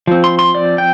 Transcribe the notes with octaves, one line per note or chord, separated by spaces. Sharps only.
F3 C4
C6
C6
D5
G5